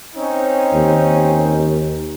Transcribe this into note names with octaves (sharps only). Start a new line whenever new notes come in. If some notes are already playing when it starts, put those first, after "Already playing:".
C4 C#4 D#4
D#2